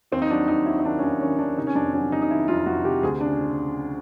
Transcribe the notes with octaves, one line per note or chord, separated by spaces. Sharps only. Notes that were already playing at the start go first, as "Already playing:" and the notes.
D#2 C4
D#4
F#3 D4
D#2 D#4
F#3 E4
D#4
D#3 D4
C#4
D#2 D4
D#3 C#4
D#3 D4
C3 D#4
C#4
F2 D4
F#3 C#4
C3 D#4
D#4
D#3 E4
F2 F4
F2 F#4
C3 G4
D2 G#4
C#3 D4